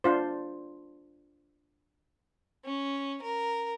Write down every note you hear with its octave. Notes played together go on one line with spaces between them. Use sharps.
D4 F4 C5
C#4
A#4